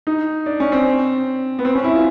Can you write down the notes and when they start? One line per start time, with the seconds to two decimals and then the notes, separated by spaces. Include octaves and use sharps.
0.07 D#4
0.46 D4
0.60 C#4
0.72 C4
1.59 B3
1.65 C4
1.75 C#4
1.84 E4
1.95 F4